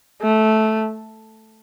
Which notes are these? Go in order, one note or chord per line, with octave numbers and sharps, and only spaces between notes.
A3